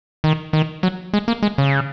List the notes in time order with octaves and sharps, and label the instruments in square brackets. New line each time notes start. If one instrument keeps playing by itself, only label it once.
[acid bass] D#3
D#3
F#3
G#3
A#3
G#3
C#3